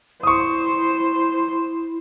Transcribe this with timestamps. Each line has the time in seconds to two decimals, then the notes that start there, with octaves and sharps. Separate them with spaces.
0.23 E4 C5 C#6 D#6